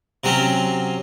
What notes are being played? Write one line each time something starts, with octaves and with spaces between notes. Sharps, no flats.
C3 F#3 C4 C#4